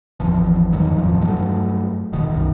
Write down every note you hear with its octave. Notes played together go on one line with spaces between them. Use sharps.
G#1 E2 E3 F3
E2 G2 D#3 F#3
D1 A1 E2 F3
G2 F#3 A3
E1 B2 D#3
B1 F#2 D#3